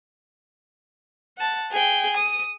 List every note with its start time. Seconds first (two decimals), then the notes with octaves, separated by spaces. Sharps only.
1.38 F#5 A5
1.71 G#4 G5
2.17 D#6